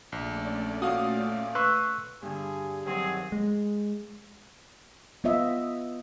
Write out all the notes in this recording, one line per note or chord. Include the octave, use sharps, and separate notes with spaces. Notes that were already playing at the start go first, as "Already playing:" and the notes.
A#1 A3 C#4 D5
A#2 F#4 F5 D#6
B4 C6 C#6 E6 F#6
G2 D3 G#4
G2 D#3 F#3 C4 G#4
G#3
B3 F4 D#5 E5